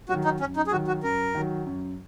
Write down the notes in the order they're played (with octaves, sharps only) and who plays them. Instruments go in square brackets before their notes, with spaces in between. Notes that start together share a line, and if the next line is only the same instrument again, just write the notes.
[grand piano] F#3 [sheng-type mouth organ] F#4
[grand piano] D#3
[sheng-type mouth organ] D#4
[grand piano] F#2 [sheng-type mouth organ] C#4
[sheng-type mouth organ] D#4
G#4
[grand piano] D#3 F#3 [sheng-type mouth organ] F#4
[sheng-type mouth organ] F#4
[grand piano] F#2 [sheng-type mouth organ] A#4
[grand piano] D#3 F#3
F#2